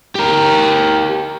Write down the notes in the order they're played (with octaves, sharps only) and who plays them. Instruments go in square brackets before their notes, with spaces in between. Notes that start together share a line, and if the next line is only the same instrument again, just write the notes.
[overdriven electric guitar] G4 A#4